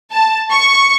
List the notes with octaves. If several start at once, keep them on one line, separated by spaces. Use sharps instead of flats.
A5
C#6